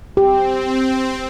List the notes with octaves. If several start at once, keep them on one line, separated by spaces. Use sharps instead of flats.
C4 G4